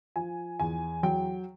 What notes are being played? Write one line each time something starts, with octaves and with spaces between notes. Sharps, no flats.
F3 G#5
E2 G#5
F#3 G5